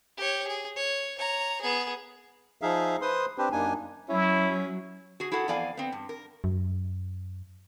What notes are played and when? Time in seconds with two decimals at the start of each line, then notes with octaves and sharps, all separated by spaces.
0.18 G4 C#5
0.47 G#4
0.76 C#5
1.18 C#5 A#5
1.61 B3 G#4
2.61 F3 D#4 G#4 E5 F5
3.02 B4 C5 C6 D#6
3.38 C4 D4 G4 B4 C5
3.52 F#2 A#3 D4 D#4 G#5
4.09 F#3 C#4 E4
5.20 F#4 G#4
5.32 E4 F#4 G#4 A4 F#5
5.48 F2 E3 B3 D5 F5 G#5
5.77 B3 C4
5.92 G2
6.09 A#4
6.44 F#2